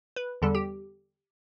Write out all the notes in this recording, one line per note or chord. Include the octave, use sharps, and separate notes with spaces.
B4
E2 D3 G3 A4
G4